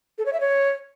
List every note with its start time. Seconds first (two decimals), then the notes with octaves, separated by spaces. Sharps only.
0.18 A4
0.26 C#5
0.33 E5
0.40 C#5